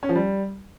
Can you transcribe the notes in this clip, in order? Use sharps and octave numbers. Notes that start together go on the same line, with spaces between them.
C#4
F3
G3